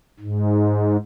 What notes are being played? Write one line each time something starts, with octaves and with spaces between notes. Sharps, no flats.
G#2